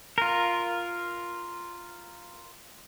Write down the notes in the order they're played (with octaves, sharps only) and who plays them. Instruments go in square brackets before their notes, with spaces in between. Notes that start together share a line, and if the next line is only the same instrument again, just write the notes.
[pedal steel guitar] F4 A#4